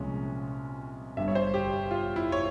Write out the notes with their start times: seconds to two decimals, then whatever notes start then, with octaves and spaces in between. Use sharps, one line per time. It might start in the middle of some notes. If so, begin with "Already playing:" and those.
Already playing: C2 A#2 F3 G#3 C#4
1.17 G1 G2 G3 E5
1.28 C#5
1.35 C5
1.54 G4
1.91 F4
2.16 E4
2.32 C#5